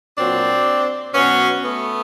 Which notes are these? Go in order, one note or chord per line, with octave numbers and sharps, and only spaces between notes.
A#2 F#3 C4 D4
B2 F#3 B3 C#4
A3 B3